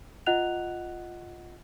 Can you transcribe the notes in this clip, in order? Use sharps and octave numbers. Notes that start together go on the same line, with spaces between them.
F4 D#5 F#5 F#6 F7